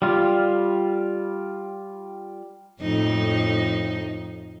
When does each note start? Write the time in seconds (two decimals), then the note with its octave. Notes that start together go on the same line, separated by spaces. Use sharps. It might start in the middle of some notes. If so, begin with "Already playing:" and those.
0.02 G3 F4
2.81 F2 A2 D#4